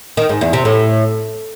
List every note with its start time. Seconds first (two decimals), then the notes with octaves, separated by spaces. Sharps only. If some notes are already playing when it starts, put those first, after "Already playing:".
0.17 D#3
0.29 G#2
0.41 E2
0.53 C3
0.65 A2